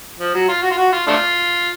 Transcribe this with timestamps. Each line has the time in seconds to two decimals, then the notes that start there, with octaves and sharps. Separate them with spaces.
0.19 F3
0.34 F#3
0.48 F4
0.63 F#4
0.71 F4
0.78 F#4
0.93 F4
1.07 A3 D4 F4